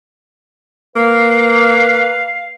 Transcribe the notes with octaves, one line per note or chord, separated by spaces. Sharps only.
A#3 B4 F5